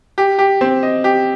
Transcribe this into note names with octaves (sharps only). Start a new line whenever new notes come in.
G4
G4
C4
D#5
G4